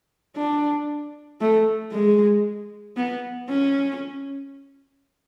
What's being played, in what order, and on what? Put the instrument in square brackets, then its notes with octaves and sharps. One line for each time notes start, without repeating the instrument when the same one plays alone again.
[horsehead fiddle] D4
A3
G#3
B3
C#4